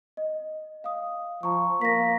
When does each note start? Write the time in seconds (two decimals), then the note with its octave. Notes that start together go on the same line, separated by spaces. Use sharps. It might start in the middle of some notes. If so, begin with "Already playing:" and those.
0.17 D#5
0.84 F5 D#6
1.43 F3 A#5 C#6
1.81 A#3 A#6 B6